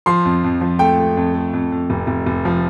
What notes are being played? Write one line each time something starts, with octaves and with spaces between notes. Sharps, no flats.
F3 C6
F2
F2
F3
A3 G5
A3
F2
A3
F2
F2
F1
F1
F1
F3